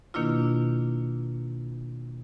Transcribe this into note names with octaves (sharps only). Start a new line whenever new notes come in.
B2 D#3 A#3 D4 E4 F4